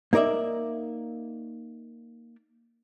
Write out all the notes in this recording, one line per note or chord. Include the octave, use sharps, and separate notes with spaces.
A#3 D#4 A#4 D5 E5